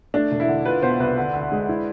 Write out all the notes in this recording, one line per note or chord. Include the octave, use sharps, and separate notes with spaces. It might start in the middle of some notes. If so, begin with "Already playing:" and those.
A3 D4
E1
E4
D3
F4 B4
B2 C5
C2 B4
D3
D2
G#3
E4